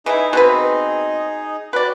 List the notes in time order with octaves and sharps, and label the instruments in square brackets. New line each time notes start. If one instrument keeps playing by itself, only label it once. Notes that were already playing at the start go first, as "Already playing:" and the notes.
[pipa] E3 E4 [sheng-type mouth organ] D#4 G#4 D#5
[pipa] B2 C4 B4
[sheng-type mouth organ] F#4 G5 F#6 [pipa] B4 D5